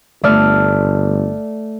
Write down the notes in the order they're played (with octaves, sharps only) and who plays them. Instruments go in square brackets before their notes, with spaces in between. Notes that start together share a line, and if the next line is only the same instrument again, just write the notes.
[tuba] G1 [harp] A3 D5 F6